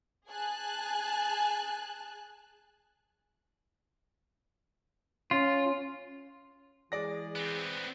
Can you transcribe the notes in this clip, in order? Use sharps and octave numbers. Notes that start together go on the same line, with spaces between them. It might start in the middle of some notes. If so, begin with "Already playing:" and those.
G#4 G#5 A5 F#6
C#4 F4
E3 G#3 G#4 D5 A#6
B3 C4